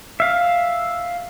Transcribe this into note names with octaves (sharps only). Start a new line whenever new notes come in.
E5 F5